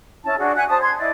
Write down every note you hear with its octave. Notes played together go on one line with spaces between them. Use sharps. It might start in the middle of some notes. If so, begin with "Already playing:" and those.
C#4 E4 A5
D4 F#4 G#4
E5 F#5 G#5 F#6
C5 A5 D#6
C6 G#6
E4 D5 D#5